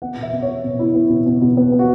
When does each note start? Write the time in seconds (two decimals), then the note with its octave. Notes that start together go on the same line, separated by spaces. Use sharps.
0.02 B3 F#5
0.17 B2
0.23 E5
0.33 B2
0.42 C#5
0.47 B3
0.64 B2
0.79 E4
0.94 B3
1.10 B2
1.26 B2
1.41 B2
1.57 B3
1.72 B3
1.79 F#4